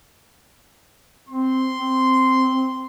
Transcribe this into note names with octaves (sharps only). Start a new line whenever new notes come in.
C4 C6
C4